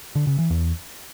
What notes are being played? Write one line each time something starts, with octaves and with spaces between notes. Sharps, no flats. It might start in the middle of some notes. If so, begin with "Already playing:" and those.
D3
C#3
E3
E2